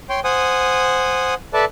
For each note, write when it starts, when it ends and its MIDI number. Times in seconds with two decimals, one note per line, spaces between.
0.09 0.20 73
0.09 0.20 79
0.09 0.20 84
0.24 1.34 72
0.24 1.34 78
0.24 1.34 80
0.24 1.34 87
1.53 1.65 69
1.53 1.65 71
1.53 1.65 74
1.53 1.65 76
1.53 1.65 81